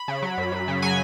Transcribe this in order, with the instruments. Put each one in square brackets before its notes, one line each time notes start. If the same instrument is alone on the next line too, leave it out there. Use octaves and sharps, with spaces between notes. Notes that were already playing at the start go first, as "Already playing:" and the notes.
Already playing: [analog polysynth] B5
C#3
F#3
F#2
F#2
C#3
F#3 G#5